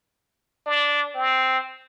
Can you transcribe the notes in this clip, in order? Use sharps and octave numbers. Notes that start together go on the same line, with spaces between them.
D4
C4